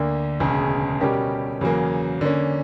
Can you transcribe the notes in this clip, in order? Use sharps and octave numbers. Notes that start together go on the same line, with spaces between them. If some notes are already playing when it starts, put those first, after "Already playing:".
Already playing: D2 D3 A#3
E1 D2 C#3
B2 G3 C#4 G4 A#4
E2 C#3 F#3 A#3
D3 A#3 C#4